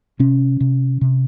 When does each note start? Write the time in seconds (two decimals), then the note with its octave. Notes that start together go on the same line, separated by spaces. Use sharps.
0.19 C3 C#4
0.60 C3
1.01 C3